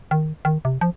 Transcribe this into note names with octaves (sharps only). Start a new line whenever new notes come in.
D#3
D#3
C3
F3